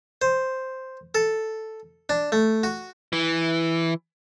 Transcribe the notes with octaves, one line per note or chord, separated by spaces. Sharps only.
C5
A4
D4
A3
F#4
E3